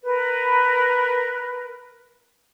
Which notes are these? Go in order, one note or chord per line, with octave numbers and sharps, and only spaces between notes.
A#4 B4